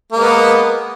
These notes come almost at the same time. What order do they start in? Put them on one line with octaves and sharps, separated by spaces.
A#3 G#3 B3